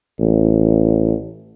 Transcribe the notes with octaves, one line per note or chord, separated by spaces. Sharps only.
A1